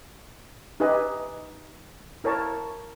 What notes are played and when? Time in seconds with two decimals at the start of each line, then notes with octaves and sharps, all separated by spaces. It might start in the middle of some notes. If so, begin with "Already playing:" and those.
0.80 D#4 G4 B4 D#5 E5 G#5
2.24 E4 A#4 C#5 A5